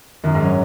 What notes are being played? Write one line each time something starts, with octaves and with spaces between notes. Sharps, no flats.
F#2 D#3
G#2
F#3 C#4